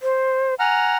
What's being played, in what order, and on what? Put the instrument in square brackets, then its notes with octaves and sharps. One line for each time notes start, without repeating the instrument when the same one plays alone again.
[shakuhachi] C5
[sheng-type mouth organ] F#5 A#5 F6 [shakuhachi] G#5